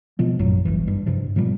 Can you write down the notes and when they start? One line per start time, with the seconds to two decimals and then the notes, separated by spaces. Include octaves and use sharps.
0.19 B2 F3 G#3
0.39 A1 F#2 A#2 F#3
0.65 G1 C2 E3
0.88 G2
1.06 G2 C3 F3
1.36 G#2 B2 F3 G3